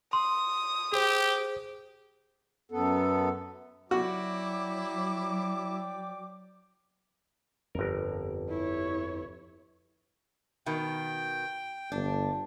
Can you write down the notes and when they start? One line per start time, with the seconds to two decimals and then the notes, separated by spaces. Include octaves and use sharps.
0.13 C6 D#6
0.93 G4 G#4 C5
2.72 F#2 B3 A4
3.91 F#3 E4 F#4 D5 G5 D6
7.75 G1 F2 D3 A#4
8.49 E4 C#5
10.66 B2 D#3 G5
11.92 G1 D4